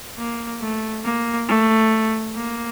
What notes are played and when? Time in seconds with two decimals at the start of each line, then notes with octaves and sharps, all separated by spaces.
0.19 A#3
0.61 A3
1.05 A#3
1.48 A3
2.36 A#3